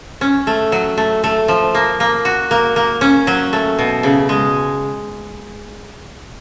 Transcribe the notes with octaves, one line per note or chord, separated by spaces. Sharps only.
C#4
A3
F#3
A3
A3
F3
A#3
A#3
F#4
A#3
A#3
C#4
F#3
A3
B2
C#3
G#3